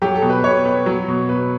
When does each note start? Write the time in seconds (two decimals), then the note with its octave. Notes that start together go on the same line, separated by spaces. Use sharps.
0.02 F#3 G4
0.15 A4
0.22 B2
0.30 B4
0.44 B2 C#5
0.65 B3
0.86 F#3
1.08 B2
1.29 B2 B4